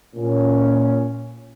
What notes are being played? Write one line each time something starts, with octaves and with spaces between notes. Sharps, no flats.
A#2 C#4